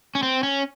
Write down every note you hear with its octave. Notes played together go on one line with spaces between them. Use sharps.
C#4
C4
C#4